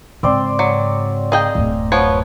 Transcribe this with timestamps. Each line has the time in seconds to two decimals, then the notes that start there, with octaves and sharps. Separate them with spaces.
0.23 G#2 C#3 C4 D5 C6
0.59 F#3
1.32 G#4 D#5 F5 G5 A#5
1.55 D1 F#2
1.92 F3 B3 C#5